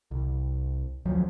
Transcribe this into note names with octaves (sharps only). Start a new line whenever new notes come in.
C2
D2 F3 F#3